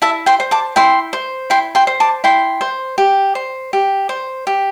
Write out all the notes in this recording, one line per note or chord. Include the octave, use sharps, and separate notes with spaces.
E4 E5 A5
G5 C6
C5
A5 D6
E4 G5 C6
C5
E4 G5 C6
G5 C6
C5
A5 D6
E4 G5 C6
C5
G4
C5
G4
C5
G4